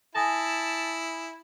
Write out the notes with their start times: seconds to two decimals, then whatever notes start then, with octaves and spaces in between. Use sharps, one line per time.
0.15 E4 G#5 A5 D#6 A#6